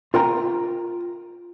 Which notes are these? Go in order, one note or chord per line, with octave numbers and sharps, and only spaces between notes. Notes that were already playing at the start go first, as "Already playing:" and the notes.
F4 A#4 G5 A#5